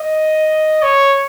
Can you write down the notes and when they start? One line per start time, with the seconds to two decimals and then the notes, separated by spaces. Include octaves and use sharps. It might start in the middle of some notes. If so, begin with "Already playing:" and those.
Already playing: D#5
0.83 C#5